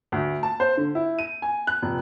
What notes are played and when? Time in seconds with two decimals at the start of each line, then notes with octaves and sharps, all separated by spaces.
0.12 D2
0.43 A5
0.60 C5
0.77 D3
0.95 E4
1.19 D#7
1.42 G#5
1.67 F#6
1.82 F1